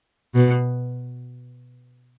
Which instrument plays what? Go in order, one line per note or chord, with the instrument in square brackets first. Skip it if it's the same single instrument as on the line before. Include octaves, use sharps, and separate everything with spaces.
[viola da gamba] B2